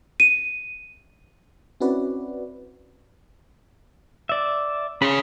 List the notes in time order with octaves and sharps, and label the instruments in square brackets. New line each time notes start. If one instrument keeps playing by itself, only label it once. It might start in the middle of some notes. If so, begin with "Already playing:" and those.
[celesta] D#7
[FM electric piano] C4 C#4 E4 F#4 B4 D5
[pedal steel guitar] D5 E5
[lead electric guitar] C#4 G#4 [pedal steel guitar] B5 C6